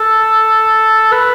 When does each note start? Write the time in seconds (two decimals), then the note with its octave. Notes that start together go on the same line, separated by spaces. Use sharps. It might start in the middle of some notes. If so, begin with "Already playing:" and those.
Already playing: A4
1.12 B4